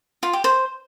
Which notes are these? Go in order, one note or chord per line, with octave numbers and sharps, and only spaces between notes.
F4
G4
C5